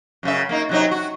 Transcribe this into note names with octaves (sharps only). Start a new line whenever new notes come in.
F#2 C#3 E5
A#3 D#4
C3 F#3 D#4
F#4